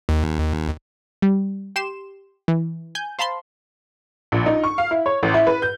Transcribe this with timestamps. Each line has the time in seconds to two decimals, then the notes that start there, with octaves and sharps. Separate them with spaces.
0.09 D#2
1.22 G3
1.76 G4 C6 E7
2.48 E3
2.95 G#5 G6
3.19 C5 F5 A5 B5 C6
4.32 A#1
4.46 D#4
4.64 C#6
4.78 F5
4.91 E4
5.06 C#5
5.23 A1
5.34 E4
5.47 B4
5.62 G6